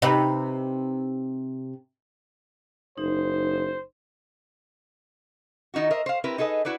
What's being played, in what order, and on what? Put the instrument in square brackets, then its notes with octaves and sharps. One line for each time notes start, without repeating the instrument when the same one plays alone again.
[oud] C3 D#4 B4
[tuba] F#1 [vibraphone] D#4 [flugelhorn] C5
[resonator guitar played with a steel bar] D#3 D#4 E4 F#4
A#4 C5 D#5 E5
C5 F5
C4 E4 G4 A#4 B4
D#4 G#4 A4 B4 D#5
E4 F#4 B4 D5